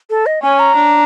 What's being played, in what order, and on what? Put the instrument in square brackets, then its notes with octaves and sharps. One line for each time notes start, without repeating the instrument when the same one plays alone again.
[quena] A4
D#5
[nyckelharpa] C#4 [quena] G#5
[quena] A#5
[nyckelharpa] D4